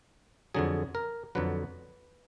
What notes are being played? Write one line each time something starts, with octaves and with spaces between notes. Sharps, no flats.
F2 D3 F#3 G#4
A#4
F2 D3 F#3 B4